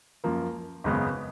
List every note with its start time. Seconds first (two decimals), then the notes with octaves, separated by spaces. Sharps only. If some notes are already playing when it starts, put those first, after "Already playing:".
0.24 F#2 F3 A#3
0.84 G#1 F#2 C#3 G#3 B3